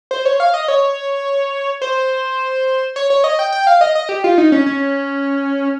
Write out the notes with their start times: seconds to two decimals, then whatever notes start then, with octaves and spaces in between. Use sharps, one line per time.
0.11 C5
0.25 C#5
0.40 F5
0.54 D#5
0.68 C#5
1.82 C5
2.96 C#5
3.10 C#5
3.24 D#5
3.39 G5
3.52 G5
3.67 F5
3.81 D#5
3.95 D#5
4.09 G4
4.24 F4
4.38 D#4
4.52 C#4
4.66 C#4